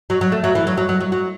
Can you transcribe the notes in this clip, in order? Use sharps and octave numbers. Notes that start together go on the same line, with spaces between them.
F#3
F#3
A3
F#3
E3
F#3
F#3
F#3
F#3
F#3